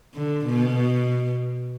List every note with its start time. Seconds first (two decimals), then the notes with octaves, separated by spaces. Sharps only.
0.14 D3
0.45 B2